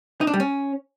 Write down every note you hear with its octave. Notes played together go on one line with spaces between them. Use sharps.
D#4
D4
G3
C#4